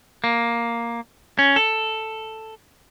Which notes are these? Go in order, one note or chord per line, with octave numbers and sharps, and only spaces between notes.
A#3
C#4
A4